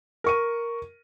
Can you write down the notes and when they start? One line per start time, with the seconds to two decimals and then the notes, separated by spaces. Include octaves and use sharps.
0.24 A#4 C#6 D#7